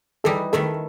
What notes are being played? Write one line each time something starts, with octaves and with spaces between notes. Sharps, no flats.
E3 G3 D#4 A4
D#3 A3 E4 A4